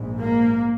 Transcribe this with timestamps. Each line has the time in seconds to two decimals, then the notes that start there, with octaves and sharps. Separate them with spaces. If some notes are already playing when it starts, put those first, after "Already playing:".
Already playing: A#1 G#2
0.19 A#3